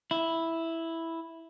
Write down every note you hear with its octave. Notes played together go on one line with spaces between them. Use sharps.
E4